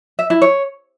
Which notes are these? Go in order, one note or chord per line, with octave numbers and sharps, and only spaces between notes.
E5
E4
C#5